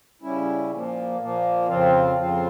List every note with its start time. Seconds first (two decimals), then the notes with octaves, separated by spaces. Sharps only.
0.22 C#3 G3 C#4 E4
0.70 A#2 F3 A#3
1.19 A#2 F3 A#3
1.68 F2 C#3 F3 C4 F4
2.15 F2 C#3 F3 C4 F4